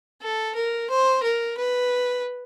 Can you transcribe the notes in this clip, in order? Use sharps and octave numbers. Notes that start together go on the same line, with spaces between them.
A4
A#4
C5
A#4
B4